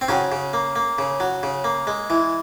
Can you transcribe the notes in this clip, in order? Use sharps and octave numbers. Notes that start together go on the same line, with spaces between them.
C4
C#3 F#3 C#4
C#3
A#3
A#3
C#3
F#3
C#3
A#3
G#3
E3